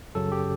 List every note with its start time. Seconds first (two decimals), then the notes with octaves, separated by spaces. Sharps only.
0.15 F#2 C#3 F#3 A4
0.32 G4